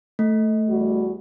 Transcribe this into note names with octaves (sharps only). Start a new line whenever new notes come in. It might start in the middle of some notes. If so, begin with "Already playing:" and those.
A3
E2 G3 F#4